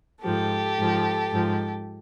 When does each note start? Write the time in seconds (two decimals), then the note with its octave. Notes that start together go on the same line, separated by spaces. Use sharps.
0.23 G#2 F3 G4 A4
0.77 G#2 F3
1.32 G#2 F3